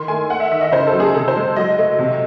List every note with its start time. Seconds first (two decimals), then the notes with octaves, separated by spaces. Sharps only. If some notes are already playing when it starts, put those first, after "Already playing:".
Already playing: D#3 C6
0.08 A3 G#5
0.30 A3 F#5
0.40 E5
0.51 D#3 E5
0.61 D#5
0.72 C#3 C5
0.87 A4
0.93 F#3
1.00 G#4
1.14 C3 A4
1.28 C5
1.36 G#3
1.56 F#3 D#5
1.78 A3
1.99 C3